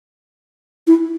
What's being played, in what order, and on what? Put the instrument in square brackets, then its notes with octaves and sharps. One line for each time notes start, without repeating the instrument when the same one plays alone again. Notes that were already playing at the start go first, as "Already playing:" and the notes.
[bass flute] E4